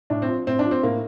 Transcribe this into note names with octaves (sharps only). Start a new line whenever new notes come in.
A2 D4
C4
F3
A2 C4
D4
F3
C4
A2 A#3